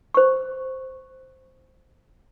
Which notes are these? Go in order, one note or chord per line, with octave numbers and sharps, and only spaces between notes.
C5 C#6